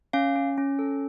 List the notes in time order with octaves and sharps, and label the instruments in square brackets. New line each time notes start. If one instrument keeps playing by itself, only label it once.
[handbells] C#4 F5
C#4
C#4
A4